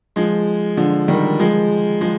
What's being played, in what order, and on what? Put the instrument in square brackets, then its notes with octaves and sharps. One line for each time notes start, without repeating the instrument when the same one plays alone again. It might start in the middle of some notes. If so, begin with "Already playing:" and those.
[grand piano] F3 G#3
D3 F3
D#3 G3
F3 G#3
F3 G#3